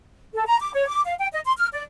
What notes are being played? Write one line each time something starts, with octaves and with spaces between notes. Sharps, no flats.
A4
A#5
D6
C#5
D6
F5
G5
D#5
C6
F6
D5